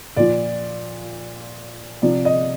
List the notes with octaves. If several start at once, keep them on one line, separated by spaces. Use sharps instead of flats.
A#2 F3 D5
C3 F3 D5
D#5